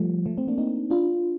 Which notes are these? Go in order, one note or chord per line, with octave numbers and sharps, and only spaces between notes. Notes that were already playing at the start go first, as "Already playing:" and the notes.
Already playing: F3 G3 A3
F3 A3
A3 C4
A#3 D4
C4 D#4
D4 F4